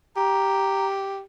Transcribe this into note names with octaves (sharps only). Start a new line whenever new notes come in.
G4 A#5